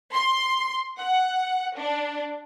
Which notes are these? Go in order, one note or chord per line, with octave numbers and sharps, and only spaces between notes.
C6
F#5
D4